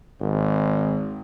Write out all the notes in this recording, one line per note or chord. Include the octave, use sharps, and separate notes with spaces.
G#1